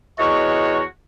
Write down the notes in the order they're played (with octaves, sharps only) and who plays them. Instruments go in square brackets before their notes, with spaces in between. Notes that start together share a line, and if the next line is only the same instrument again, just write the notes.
[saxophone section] E2 C#5 [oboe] F#4 [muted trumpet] D#5 [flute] C#6